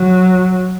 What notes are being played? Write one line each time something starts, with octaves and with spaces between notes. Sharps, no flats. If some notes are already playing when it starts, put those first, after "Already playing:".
Already playing: F#3